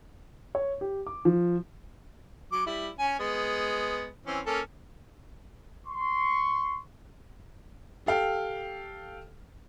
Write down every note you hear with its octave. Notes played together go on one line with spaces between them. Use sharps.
C#5
G4
D6
F3
F#3 D6
G3 E4
C#4 G#5
G#3 B3
E3 C4 C#4
A#3 C#4 A4
C6 C#6
G4 A4 F5 G5